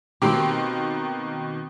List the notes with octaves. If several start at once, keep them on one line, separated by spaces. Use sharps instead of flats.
B2 D#3 A#3 C4 G4